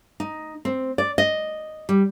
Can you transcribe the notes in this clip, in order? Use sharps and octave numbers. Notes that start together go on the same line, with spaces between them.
D#4
C4
D5
D#5
G3